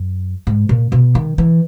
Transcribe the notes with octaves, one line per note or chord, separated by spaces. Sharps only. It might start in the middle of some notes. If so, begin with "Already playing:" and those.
Already playing: F#2
G#2
A#2
B2
D#3
E3